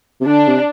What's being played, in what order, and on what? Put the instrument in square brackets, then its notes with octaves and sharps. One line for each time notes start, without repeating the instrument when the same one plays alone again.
[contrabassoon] C3
[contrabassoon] D3 [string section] D4
[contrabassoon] C3